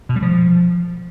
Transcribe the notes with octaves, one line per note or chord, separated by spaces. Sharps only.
B2
G3
F3